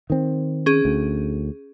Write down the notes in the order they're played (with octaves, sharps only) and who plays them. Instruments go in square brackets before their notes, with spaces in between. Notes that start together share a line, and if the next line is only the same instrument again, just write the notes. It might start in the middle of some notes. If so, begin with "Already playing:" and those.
[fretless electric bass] D#3 C4
[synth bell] C#4 G#4
[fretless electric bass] D2